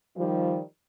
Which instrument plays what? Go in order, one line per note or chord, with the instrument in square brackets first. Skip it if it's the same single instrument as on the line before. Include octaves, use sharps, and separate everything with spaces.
[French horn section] D#3 F3 G3